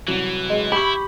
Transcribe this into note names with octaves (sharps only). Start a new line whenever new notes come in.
C2 E3 F#3
G#3
E4 G4 B5 C#6 F#7